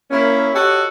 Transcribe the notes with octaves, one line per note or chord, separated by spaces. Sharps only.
A#3 C#4 E4
F#4 G4 A4 C#5 D#5 F#5